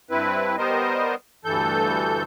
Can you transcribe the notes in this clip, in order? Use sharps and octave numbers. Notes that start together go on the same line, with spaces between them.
G2 C4 E4 B4
G3 B3 A#4 C5 D#5
D2 G2 E3 A4 G6